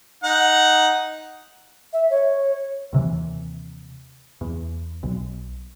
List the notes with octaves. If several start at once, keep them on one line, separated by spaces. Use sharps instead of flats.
D#4 F#5
E5
C#5
D#2 C3 E3
E2
B1